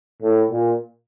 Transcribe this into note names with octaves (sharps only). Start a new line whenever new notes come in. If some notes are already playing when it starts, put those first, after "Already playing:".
A2
A#2